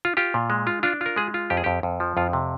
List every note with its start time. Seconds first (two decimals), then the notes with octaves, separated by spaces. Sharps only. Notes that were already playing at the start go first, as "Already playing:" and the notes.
0.05 F4
0.17 F4 G4
0.34 A#2
0.50 G#3
0.67 F4
0.83 D4 F4
1.01 F4 A#4
1.16 G#3 G#4
1.34 F4
1.50 F2 G4
1.57 G#4
1.64 F2 G4
1.83 F2
2.00 F3
2.17 F2 F4
2.33 C3